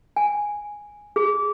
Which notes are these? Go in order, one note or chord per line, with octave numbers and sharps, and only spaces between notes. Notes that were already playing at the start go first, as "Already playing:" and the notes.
G#5
G#4